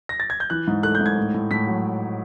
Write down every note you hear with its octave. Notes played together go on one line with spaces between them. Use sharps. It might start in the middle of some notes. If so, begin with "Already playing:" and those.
A#6
A6
G#6
G6
E3 F#6
G#2
A3 F#6
G6
G#2 G#6
A2
A2
A2 B6
F#3